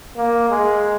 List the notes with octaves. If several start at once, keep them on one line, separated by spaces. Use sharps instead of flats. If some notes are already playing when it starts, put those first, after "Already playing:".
A#3
G#3